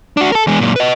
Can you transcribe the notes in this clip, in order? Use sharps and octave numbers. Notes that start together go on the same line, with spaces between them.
D4 F#4
A4 A#4
E2 G#3
F#2 A#2
B4 D#5